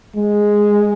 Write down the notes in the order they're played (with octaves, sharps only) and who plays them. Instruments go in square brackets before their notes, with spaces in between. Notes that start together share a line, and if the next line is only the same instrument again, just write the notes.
[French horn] G#3